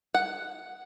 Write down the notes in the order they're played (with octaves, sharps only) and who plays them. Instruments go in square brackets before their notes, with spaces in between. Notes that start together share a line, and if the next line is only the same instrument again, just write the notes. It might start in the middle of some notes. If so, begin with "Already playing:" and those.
[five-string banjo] F#5